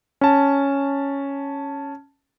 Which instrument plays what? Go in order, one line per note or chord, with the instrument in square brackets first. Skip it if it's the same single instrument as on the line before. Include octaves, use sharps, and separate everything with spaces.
[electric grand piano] C#4 A5